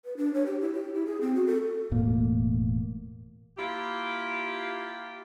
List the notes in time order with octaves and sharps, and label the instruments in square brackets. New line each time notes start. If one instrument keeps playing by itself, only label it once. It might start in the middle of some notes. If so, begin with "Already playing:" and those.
[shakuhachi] B4
D4
C#5
G4
E4
G4
E4
G#4
C4
F#4
A4
[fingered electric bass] E1 A2 A#3
[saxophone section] A#3 E4 F4 G4